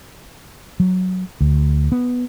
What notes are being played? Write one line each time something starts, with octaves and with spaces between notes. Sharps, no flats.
F#3
D2
B3